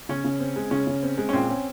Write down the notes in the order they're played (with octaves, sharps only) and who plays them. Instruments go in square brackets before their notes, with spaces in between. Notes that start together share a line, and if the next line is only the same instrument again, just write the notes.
[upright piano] C#3 [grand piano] C#4
[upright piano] C#3
C4
G#3
[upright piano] C#3 [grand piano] C#4
[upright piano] C#3
C4
G#3
[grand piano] C#4
[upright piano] A#2 [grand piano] C4
[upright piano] C#4